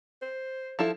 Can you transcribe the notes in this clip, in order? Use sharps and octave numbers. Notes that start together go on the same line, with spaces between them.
C5
F3 E4 A4